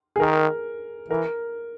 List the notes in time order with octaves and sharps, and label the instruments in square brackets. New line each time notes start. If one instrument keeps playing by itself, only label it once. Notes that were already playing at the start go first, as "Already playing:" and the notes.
[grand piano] G#4
[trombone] D#3 [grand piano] A#4
[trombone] E3 [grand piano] A#4